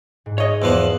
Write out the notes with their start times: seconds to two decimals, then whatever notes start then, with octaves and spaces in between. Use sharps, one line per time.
0.26 G#2
0.38 C#5 D#5
0.62 E2 F3 B3